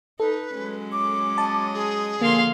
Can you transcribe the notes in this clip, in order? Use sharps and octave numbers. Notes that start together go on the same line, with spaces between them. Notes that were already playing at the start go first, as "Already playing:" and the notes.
D#4 A4 B4
F#3 G#3 C#4
D6
D#5 A5
G#4
D3 F3 A#3 F5 C6